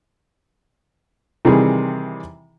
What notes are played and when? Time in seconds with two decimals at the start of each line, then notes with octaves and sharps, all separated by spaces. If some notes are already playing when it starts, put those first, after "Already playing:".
1.45 C3 D#3 E3 G3 G#4